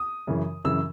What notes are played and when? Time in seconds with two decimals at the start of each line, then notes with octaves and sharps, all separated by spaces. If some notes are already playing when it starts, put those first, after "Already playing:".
Already playing: D#6
0.27 F#2 C#3 E3
0.65 F#2 C#3 E3 E6